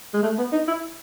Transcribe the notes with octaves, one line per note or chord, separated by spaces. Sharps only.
G#3
A3
B3
D#4
E4